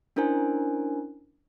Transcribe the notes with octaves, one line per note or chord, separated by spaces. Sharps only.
C#4 D4 E4 A#4 C5 G#5